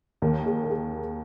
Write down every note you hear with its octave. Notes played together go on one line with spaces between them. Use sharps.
D#2 D#3 A#4
G#4
A#4
G#4